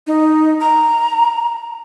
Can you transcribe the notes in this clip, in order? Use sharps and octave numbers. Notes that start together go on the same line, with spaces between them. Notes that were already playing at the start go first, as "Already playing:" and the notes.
D#4
A#5